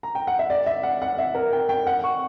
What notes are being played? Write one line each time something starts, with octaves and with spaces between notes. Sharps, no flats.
A#5
G5
F#5
E5
D5
E5
F#5
F#5
E5
A#4
G5
G5
F#5
C#6